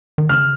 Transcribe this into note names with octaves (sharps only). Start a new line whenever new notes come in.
D#3
C#3 F6